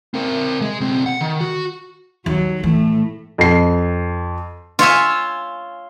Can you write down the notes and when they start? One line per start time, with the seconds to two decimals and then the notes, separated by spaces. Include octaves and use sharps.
0.14 C4 A#4
0.61 G#3
0.80 B1 C4
1.06 F#5
1.21 D#3
1.40 F#4
2.26 D#2 F#3
2.64 A2 E3 A3
3.38 F2 C7
4.79 F4 C#5 E5 G#5